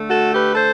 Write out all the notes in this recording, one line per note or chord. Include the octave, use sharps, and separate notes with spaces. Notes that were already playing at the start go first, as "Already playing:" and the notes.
Already playing: D3 A3
F#4 A4
G4 B4
A4 C5